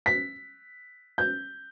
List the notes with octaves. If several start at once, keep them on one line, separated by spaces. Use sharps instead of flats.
B6
G6